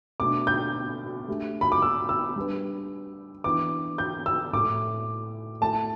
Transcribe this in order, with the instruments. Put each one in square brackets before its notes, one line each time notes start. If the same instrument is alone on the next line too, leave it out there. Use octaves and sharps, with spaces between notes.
[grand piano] B2 A3 D4 [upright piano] D6
[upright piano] G6
[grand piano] A3 D4 G4
[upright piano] B5
D6
E6
E6
[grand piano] G3 D4 B4
[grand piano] E3 B3 D4 B4 [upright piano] D6
[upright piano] G6
E6
[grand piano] A2 A3 E4 A4 [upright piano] D6
[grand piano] A3 E4 A4 [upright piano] A5